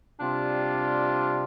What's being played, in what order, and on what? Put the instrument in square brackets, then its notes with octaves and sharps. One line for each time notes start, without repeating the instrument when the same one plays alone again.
[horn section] C3 G3 D4 F4